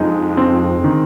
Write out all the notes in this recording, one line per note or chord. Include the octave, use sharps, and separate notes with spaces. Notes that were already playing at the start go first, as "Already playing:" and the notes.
Already playing: F2 G#3 D#4
C4
D#3